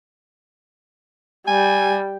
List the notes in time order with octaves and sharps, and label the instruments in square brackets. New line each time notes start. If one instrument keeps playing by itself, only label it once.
[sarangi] G3 [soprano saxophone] G#5